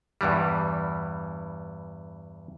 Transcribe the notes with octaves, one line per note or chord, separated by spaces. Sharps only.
E2 G2 E3 G3